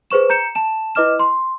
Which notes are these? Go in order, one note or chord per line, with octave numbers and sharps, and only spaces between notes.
G#4 B4 C5 C#6 E7
A#5 G6 C#7 E7
A5 E7
E4 B4 D#5 D6 F6 E7
C6